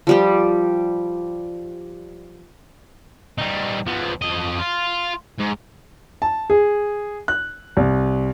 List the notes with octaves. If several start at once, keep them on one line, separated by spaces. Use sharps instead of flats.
F3 G3 G4
G3 D#4
F3 B3
F2 D#5
F4
G#2
A5
G#4
F#6
C2